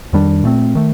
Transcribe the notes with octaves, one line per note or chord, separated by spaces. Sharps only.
F2 D#3 G3 D4
A#2 A3 C4
D#3 A3